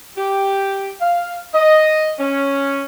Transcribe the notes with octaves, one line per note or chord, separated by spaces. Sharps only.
G4
F5
D#5
C#4